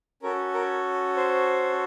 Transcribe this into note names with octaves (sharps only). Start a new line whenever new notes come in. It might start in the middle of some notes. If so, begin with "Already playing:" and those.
C#4 F#4 A4 A#4
A#4
C5